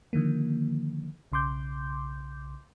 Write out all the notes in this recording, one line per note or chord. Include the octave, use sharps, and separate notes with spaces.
D3 D#3 F3 A#3
B1 C#3 C6 D6 G6